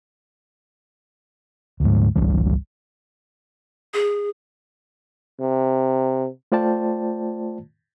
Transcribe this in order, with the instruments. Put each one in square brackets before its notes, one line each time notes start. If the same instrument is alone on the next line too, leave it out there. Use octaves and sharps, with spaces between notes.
[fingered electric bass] D2 G#2
G#1 C#2 E3 G3
[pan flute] G#4
[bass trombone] C3
[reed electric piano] A3 F4 C5 D5 G5 A5